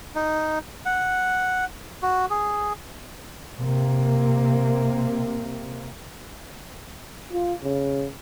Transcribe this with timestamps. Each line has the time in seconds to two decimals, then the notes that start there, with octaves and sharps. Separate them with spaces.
0.15 D#4
0.86 F#5
2.02 F#4
2.30 G#4
3.58 C3 A#3
7.33 F4
7.63 C#3